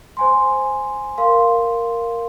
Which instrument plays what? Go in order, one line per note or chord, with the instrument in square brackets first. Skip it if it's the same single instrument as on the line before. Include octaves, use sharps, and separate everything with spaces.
[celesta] C5 G#5 C6
A#4 F5 C6